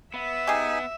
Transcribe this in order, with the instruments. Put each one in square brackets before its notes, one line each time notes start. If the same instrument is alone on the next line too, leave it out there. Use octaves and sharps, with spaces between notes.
[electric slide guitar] B3 [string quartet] E5
[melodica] D#4 G#5 [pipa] G4 G#4